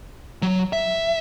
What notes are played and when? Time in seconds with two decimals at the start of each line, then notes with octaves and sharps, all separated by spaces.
0.42 F#3
0.73 E5